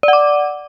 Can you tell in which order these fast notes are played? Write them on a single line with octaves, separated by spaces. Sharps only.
D5 F#5 D6